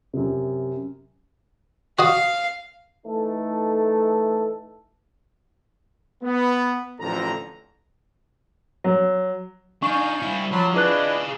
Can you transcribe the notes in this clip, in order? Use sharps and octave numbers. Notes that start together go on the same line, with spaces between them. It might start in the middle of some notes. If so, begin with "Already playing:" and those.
F#2 C3
F#4 D#5 F5 D#6
E3 A3 D#4 A4
B3
A1 F2 D3 F3 A4 A#5
F#3
D4 D#4 F5 G#5 C#6 G6
G3 E4
F3 F#3 A5 B5 C6
D4 E4 F4 G#4 B4 D#5 F5 F#6